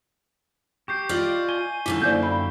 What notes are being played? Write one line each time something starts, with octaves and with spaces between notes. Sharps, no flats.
G4 C#6 G6 C7
F4 D5 D#5
G#5 G7
F#2 D3 D#4 E4 B6
A#3 E4 C5 D5 F5 G6
F5 G5 B5